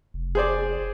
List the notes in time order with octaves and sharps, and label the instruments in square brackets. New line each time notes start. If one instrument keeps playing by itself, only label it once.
[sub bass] F1
[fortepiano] G#4 C5 D5